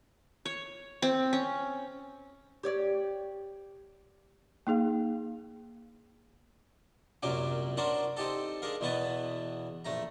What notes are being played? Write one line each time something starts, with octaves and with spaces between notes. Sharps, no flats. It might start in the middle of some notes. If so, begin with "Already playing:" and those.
C#5
C4
C#4
G4 C#5 D5
A#3 D#4 G#4 F5
C2 F#2 A#2 F#3 C#4 D6
C#4 D4 F#4 A#4 C5 D5
C4 D#4 G4 A4
G#3 D4 A#4 F5
E2 B2 B3 B4 A5
A#1 A3 A#5